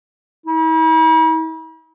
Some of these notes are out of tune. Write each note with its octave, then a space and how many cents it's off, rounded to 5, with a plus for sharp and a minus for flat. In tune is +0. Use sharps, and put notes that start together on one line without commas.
E4 -45